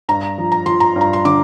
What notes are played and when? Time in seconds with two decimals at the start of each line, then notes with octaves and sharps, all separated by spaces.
0.09 G2 A#5
0.38 F3
0.52 A#5
0.66 F3 C6
0.80 A#5
0.96 G2
1.01 A#5
1.13 C6
1.25 D3 D6